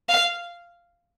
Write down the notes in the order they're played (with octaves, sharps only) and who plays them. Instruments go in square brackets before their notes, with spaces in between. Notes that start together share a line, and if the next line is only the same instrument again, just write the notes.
[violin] F5